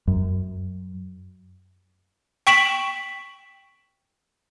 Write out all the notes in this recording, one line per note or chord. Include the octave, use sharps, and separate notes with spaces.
F#2
G5 C#6 B6 D7 E7 F#7